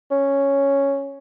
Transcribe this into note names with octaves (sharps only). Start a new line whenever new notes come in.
C#4